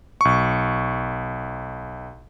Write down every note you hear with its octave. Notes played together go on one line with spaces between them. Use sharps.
B1 C#6